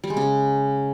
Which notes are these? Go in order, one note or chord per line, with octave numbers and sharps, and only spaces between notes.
G3
G#3
C#3